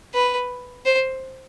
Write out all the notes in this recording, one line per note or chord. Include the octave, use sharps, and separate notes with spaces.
B4
C5